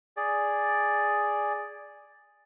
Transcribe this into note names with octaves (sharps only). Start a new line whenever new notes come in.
G#4 D5